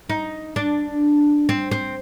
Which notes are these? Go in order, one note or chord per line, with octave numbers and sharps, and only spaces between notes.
D#4
D4
C4
C4